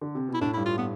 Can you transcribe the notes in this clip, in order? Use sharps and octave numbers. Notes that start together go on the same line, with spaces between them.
D3
C3
B2
E4
A2 D4
E4
G2
F4
B3